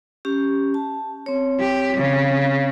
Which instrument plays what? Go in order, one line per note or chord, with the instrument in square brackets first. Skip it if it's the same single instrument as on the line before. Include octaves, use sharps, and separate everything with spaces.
[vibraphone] C#4 G4
A5
C4 C#5
[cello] G4
C#3